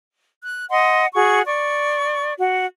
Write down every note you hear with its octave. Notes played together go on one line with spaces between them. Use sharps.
F#6
D#5 F#5 C6
F#4 G#4 C#6
D5 C#6
F#4